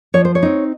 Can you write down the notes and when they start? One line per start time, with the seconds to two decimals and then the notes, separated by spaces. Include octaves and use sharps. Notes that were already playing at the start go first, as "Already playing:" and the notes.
0.14 F3 C#5
0.25 C5
0.35 C#5
0.43 C4 D#4